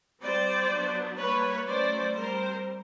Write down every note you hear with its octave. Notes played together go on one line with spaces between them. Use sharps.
G3 C4 C5 D5
F#3 B3 D4
G3 A#3 D4 B4 C#5
F#3 A3 C#4 C5 D5
G3 C4 A#4 C5